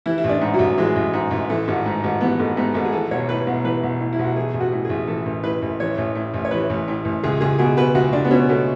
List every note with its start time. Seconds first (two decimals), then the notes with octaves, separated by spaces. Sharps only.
0.06 E3 E4
0.18 E4
0.24 A1
0.29 D4
0.41 G#2
0.54 F#3
0.59 A1
0.78 E3 G#3
0.96 A1
1.13 G#2
1.31 A1
1.50 E3 A3
1.68 G#1
1.86 G#2
2.04 G#1
2.21 E3 B3
2.39 G#1 A3
2.57 G#2 B3
2.74 G#1 A4
2.85 G#4
2.92 E3 A4
3.11 B1 C#5
3.29 A2 B4
3.47 B1
3.64 E3 B4
3.83 B1
4.00 A2
4.13 E4
4.19 B1
4.24 F#4
4.36 E3 G#4
4.54 A1
4.60 F#4
4.72 A2
4.85 A1 G#4
5.07 E3 A4
5.26 A1
5.43 A2 B4
5.62 A1
5.80 E3 C#5
5.98 A1
6.15 A2
6.34 A1
6.45 C#5
6.51 E3 B4
6.70 A1
6.88 A2
7.05 A1
7.23 C#2 G#4
7.41 C#2 G#4
7.59 B2 G#4
7.77 B2 B4
7.95 C#2 F#4
8.13 C#2 D4
8.25 B3
8.31 B2 C#4
8.49 B2 A3